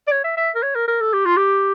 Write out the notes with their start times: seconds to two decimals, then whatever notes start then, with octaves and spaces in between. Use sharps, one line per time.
0.07 D5
0.11 C#5
0.24 E5
0.37 E5
0.55 A#4
0.63 C#5
0.75 A#4
0.88 A#4
1.01 A4
1.13 G4
1.26 F4
1.37 G4